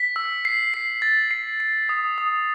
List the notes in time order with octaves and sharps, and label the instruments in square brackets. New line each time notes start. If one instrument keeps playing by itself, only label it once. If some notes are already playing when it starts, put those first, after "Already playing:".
Already playing: [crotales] B6
E6
C7
C7
A6
C7
C7
D#6
D#6